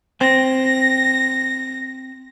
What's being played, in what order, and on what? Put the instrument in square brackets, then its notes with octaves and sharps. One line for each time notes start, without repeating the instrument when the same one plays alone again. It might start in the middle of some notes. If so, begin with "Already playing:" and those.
[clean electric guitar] C4 [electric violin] A#6